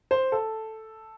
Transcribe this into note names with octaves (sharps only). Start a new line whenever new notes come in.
C5
A4